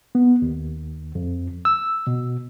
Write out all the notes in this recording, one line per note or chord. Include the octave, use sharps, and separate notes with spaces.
B3
D#2
F2
E6
B2